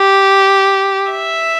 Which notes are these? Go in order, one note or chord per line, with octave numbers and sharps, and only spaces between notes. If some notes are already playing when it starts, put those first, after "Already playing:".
Already playing: G4
E5